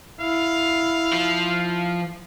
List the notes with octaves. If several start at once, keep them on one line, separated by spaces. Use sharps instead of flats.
E4 F5
F3